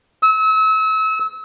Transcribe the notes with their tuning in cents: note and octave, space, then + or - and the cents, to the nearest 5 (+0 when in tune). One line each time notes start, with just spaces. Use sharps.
E6 -35